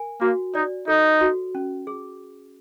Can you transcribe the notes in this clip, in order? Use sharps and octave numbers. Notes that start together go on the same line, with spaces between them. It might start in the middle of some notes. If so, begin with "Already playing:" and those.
Already playing: A#4 G#5
A#3 F#4
D#4 D5
D#4 A4
F#4
C#4
G#4